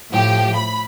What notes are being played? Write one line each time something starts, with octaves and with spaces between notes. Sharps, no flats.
A2 F3 G4
B5